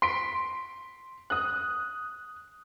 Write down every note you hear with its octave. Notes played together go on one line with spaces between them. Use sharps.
C6 B6 D7
D#6 F#6